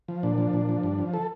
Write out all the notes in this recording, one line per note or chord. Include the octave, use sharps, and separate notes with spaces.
F3
A#2 D4
F3
A#2
F3
G2
F3
A4